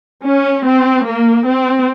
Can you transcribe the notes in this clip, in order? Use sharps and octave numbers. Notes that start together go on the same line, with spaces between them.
C#4
C4
A#3
C4